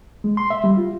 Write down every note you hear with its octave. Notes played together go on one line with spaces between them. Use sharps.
G#3
C6
E5
G3
F4